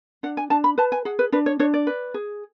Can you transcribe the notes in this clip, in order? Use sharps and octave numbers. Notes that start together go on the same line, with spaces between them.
D4 F#5
G#5
D4 A5
B5
B4 A5
G#5
G#4 F#5
B4
D4 B4
C#5
D4 C#5
D5
B4
G#4